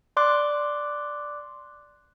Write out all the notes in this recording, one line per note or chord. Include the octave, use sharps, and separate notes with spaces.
D5 C6 D6 F#6